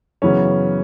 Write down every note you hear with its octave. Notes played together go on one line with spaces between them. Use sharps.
F#2 C#3 E3 B3 C#4